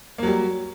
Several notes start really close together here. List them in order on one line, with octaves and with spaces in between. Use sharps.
A#3 F#3 G3